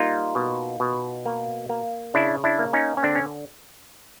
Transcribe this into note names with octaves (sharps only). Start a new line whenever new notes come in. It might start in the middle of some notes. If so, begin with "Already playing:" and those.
Already playing: G3 A#3 D#4 F4
B2
B2
A#3
A#3
C#3 D4 E4
D4 E4
A#3
C#4 D#4
C#4
D3 C4 D4
C#4